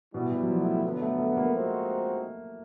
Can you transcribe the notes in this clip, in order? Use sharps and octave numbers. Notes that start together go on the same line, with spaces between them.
B2 G3 B3 E4
B2
F#3
F3
A3
A3
D3 F#3 B3
A3
A3
A#3
F3 G#3 C4 D#4 F#4